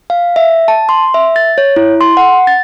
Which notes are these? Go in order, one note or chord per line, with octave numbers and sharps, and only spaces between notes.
F5
E5
A5
C6
E5
A6
C#5
E4
C6
F#5
A6